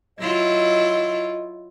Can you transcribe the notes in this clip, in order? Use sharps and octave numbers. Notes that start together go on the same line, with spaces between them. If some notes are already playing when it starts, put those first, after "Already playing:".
F#3 E4 F4 D#5